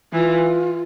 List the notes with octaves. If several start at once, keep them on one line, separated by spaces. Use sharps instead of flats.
E3 F4